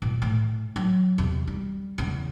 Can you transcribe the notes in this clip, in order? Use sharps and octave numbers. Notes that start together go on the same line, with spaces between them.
E2 A#2
A2 A3
F#3
E2 C3
G3
E2 C#3